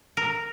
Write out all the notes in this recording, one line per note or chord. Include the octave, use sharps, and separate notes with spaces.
A#4